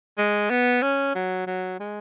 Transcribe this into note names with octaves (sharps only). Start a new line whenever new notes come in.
G#3
B3
C#4
F#3
F#3
G#3